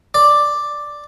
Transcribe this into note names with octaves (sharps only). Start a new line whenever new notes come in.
D5